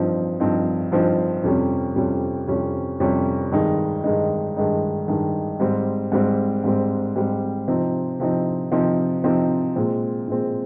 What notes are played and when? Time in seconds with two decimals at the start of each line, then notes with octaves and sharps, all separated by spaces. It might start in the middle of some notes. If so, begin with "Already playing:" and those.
Already playing: G2 F3 C4 D#4
0.40 G2 F3 C4 D#4
0.92 G2 F3 C4 D#4
1.44 F2 C3 G3 C#4
1.96 F2 C3 G3 C#4
2.48 F2 C3 G3 C#4
3.00 F2 C3 G3 C#4
3.52 G2 D#3 G#3 D#4
4.04 G2 D#3 G#3 D#4
4.56 G2 D#3 G#3 D#4
5.08 G2 D#3 G#3 D#4
5.60 G#2 G3 C4
6.12 G#2 G3 C4
6.64 G#2 G3 C4
7.16 G#2 G3 C4
7.68 C3 F3 C4 D#4
8.20 C3 F3 C4 D#4
8.72 C3 F3 C4 D#4
9.24 C3 F3 C4 D#4
9.76 A#2 G#3 C4
10.28 A#2 G#3 C4